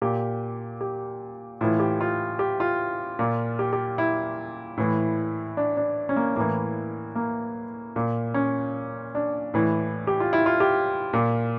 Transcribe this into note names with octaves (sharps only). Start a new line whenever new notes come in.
A#2 G4
G4
A2 E3 F4
G4
F4
G4
F4
A#2
G4
G4
E4
A2 E3
D4
D4
C#4
A#3
A2 E3 A#3
A#3
A#2
C#4
D4
A2 E3
G4
F4
E4
F4
G4
A#2